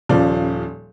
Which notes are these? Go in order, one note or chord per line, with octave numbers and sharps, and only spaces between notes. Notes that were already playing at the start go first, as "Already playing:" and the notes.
D#1 C#3 F3 D5